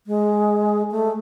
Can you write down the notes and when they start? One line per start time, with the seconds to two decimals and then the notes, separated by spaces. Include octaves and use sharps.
0.07 G#3
0.91 A3